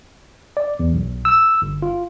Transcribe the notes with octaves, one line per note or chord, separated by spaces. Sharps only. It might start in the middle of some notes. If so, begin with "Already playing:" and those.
D5
E2
B1
E6
G1
F4